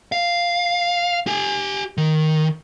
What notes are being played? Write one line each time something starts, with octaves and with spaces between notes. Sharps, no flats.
F5
G4 G#5
D#3